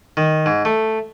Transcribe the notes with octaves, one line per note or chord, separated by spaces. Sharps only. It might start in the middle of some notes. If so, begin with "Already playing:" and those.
D#3
G#2
A3